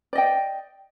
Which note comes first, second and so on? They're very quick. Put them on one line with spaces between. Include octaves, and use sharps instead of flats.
D5 D#5 G5